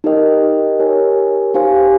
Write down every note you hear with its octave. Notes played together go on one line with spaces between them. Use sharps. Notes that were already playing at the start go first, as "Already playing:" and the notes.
D#4 G4 A#4 D#5 G5
G4 A#4 C#5 G#5
D#4 G4 C5 F5 G#5